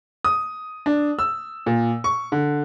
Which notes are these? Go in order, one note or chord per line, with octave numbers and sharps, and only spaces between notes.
D#6
D4
E6
A#2
C#6
D3